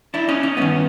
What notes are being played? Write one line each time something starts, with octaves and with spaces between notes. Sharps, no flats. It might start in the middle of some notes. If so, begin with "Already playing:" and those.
D4 E4
C#4 D#4
C#4 D#4
G2 D#3 B3 C#4